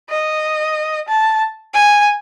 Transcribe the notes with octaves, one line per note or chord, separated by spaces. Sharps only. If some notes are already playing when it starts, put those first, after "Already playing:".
D#5
A5
G#5